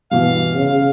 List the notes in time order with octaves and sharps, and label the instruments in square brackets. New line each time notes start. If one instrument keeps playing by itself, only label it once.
[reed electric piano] G2 B2 E3 [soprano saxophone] F5
[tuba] C#3